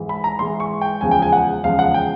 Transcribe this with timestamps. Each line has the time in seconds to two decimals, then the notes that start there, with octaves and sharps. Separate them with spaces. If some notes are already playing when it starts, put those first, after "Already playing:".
Already playing: G#2 E3 G#3
0.09 B5
0.24 A#5
0.39 G#2 E3 G#3 C6
0.60 C#6
0.81 G5
1.01 E2 C#3 F3 G#3 G#5
1.11 G5
1.22 G#5
1.33 F#5
1.64 E2 C#3 F3 G#3 F5
1.79 F#5
1.94 G5